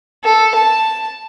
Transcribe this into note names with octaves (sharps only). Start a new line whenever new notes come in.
A4
A5